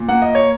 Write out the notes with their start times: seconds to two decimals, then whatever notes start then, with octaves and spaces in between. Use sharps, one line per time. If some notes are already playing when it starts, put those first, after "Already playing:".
Already playing: A#2
0.09 A#3 F#5
0.22 D#5
0.35 C#5